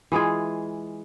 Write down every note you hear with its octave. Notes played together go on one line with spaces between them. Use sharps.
E3 G#3 F4 G#4